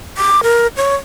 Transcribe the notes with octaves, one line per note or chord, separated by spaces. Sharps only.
D6
A#4
C#5